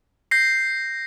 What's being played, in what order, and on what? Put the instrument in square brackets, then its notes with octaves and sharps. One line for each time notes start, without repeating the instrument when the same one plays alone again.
[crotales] G6 A#6 C7